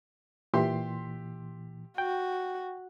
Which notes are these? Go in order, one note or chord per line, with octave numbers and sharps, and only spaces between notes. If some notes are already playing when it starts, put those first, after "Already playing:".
A#2 E3 G4 E5 C6
F#4 G5